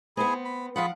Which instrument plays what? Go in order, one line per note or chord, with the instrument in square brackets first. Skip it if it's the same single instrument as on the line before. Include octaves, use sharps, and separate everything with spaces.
[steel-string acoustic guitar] B3 C4 [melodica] E4 G#4 G#5
[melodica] B5
[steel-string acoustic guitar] F3 F5 F#5 [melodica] F4 G#4 B5